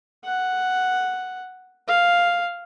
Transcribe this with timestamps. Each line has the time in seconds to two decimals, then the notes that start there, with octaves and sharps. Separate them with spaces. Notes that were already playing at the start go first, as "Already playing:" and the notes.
0.25 F#5
1.88 F5